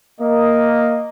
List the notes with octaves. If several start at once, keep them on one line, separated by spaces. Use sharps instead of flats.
A#3 D#5